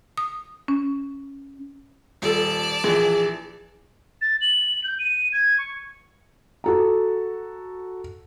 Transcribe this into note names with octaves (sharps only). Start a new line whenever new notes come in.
D#6
C#4
D#1 A4 D5 A5
A#1 E3 G#4
A6
F#7
G6
D#7
G#6
C#6
F#4 A4 A#5